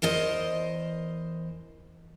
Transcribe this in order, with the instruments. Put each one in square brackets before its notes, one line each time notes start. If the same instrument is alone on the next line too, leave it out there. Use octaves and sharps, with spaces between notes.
[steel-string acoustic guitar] E2 A#4 C5 D#5